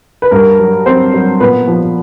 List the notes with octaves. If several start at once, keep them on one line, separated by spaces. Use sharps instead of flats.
B4
G2 A#4
F#3
F#3 C4 C5
F#3
A#2 B3 B4
F3